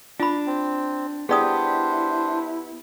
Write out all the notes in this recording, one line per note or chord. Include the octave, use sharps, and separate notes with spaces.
D4 F4 B5
C4
B3 D4 E4 G4 G#4 C5 D5 D#6